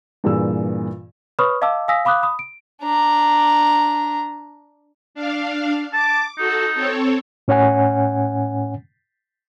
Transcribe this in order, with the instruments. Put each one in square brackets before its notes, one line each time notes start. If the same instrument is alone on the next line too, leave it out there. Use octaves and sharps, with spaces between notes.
[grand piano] G2 A#2 E3 G#4 E6
[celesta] B4 C#5 B5 C#6 D#6 F6
D#5 F5 A5 D6 E6
F5 G#5 D#6 E6 A#6 B6
F5 B5 D6 D#6 F#6
B5 D#6
D7
[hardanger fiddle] D4 A#5
[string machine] D4 F5
[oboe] A5 [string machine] D6
[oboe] D#4 [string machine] F#4 A4
[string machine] C4 A4 C#5
[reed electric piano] A2 C#4 C#5 F#5 G#5